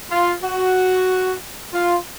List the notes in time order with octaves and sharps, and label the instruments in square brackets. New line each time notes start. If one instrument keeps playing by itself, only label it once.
[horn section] F4
F#4
F4